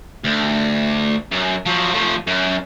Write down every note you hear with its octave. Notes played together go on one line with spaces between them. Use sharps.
D2
F#2
F3 F#3
F3 A3
F#2